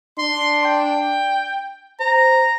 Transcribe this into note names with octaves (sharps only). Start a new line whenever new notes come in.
D4 C6
G5
C5 A#5